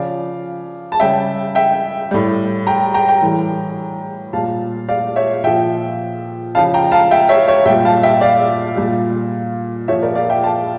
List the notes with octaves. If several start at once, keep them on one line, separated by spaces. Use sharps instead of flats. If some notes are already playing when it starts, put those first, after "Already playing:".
Already playing: C#3 F3 D5 F5
A5
C#3 G3 E5 G5
E5 G5
A2 G3
G5 A#5
G5 A#5
G5 A#5
A2 E3 G3
A#2 G3 F5 A5
D5 F5
C#5 E5
A#2 F3 E5 G5
C#3 F3 F5 A5
G5 A#5
F5 A5
E5 G5
C#5 E5
C#5 E5
A#2 G3 E5 G5
F5 A5
E5 G5
D5 F5
A#2 G3
A#2 F3 C#5 E5
A#4 D5
D5 F5
E5 G5
F5 A5